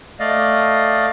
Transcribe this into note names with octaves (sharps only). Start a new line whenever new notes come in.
A3 D5 D#5 F5